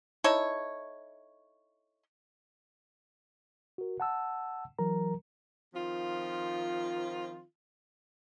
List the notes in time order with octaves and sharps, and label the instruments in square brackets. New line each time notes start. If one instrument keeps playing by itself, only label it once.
[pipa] D#4 E4 A4 C#5
[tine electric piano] F#4 A#4
F#5 A5 E6
E3 F#3 A#4 A#5
[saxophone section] D#3 F3 C4 F4